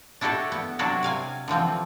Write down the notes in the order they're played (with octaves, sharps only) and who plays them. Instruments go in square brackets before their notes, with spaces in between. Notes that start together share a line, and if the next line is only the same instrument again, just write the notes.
[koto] D4 E4 F#4 G4 A4
B3
C3 F#3 D4 E4 F#4
C3 F5 G#5
D3 E3 F3 C4